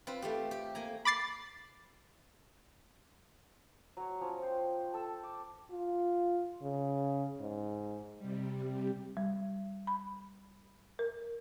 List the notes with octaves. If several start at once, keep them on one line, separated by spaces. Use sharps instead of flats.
C4 F4 B4
A3 C4 G4
G4
A#3 G#5 A#5
B5 D6 A6 C7
F#3 C#5
F3 C#4 C#5
G5 C6
A4 E6
D6
F4
C#3
G#2
C3 G3
G3
B5
A#4